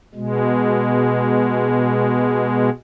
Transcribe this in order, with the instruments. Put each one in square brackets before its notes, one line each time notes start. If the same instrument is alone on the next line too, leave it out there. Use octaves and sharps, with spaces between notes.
[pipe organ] B2 G#3